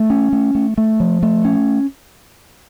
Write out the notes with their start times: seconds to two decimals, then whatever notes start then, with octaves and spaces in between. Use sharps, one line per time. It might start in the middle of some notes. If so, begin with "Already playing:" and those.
Already playing: A3
0.10 C#4
0.33 A3
0.55 A3
0.78 A3
1.00 F3
1.23 A3
1.45 C#4